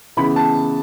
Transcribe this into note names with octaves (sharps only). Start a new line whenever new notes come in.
C#3 E3 B3 E4 B5
A5